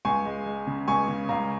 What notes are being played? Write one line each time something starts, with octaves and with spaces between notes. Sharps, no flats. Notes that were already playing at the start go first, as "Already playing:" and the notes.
C#2 G#5 C#6
G#3
G#3
C#3
C#2 G#5 C#6
C#3
C#2 F5 A#5